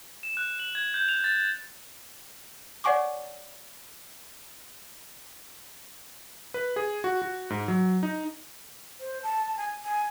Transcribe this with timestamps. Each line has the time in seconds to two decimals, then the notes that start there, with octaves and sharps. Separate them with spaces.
0.23 E7
0.37 F#6
0.60 F#7
0.75 G#6
0.94 G6
1.09 F7
1.24 A6
2.84 C#5 D5 F#5 G#5 C#6 D6
6.54 B4
6.76 G#4
7.04 F#4
7.22 F#4
7.50 G#2
7.68 F#3
8.03 D#4
9.00 C5
9.23 A5
9.57 G#5
9.84 G#5